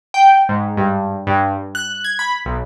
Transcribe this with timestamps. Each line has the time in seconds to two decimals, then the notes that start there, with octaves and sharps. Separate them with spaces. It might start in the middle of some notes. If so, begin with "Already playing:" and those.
0.14 G5
0.49 G#2
0.77 G2
1.27 G2
1.75 F#6
2.04 G#6
2.19 B5
2.45 B1